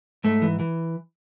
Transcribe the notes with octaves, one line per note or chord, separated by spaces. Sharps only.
G#2 A3
E3
E3